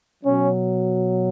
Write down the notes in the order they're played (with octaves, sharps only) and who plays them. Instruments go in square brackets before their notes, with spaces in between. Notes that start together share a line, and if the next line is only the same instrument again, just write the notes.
[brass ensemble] B2 F#3 C#4